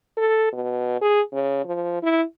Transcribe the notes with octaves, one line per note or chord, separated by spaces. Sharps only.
A4
B2
G#4
C#3
F3
E4